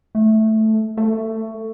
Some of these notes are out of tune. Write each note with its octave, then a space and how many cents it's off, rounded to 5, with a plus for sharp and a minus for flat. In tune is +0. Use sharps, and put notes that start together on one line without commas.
A3 -5
A3 +15